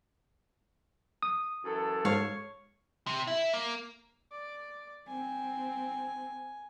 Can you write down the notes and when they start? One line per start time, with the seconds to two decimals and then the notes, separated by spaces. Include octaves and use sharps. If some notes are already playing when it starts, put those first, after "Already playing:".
1.23 D#6
1.65 F#2 E3 A4
2.05 G#2 C#5 F5
3.07 C3
3.27 E4
3.54 A#3
4.32 D5
5.08 C4 G#5